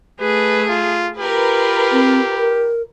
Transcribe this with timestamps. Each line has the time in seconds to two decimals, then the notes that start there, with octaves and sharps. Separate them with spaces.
0.21 A3 G#4 B4
0.69 F4
1.19 F4 G4 A#4 B4
1.92 C4
2.37 A#4